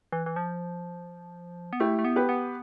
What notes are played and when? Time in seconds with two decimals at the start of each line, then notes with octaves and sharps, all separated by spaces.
0.12 E3
0.26 E3
0.36 F3
1.73 B3
1.80 A3 E4 G4
1.99 A3
2.05 B3
2.16 G4 B4
2.29 B3